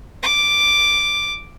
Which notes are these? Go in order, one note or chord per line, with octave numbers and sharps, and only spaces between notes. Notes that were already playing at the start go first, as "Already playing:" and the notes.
D6